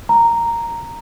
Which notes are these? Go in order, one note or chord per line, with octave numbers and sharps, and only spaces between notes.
A#5